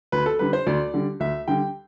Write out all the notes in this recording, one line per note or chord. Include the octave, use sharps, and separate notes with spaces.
D2 B4
A4
D3 G3 B4
C5
D2 D5
D3 G3
D2 E5
D3 G3 G5